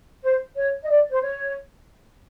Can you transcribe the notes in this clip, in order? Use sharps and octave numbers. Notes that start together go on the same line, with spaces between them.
C5
C#5
D#5
D5
C5
C#5